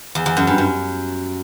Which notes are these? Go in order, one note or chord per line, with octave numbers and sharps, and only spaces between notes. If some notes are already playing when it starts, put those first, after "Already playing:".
E2
E2
F#2
G2
F#2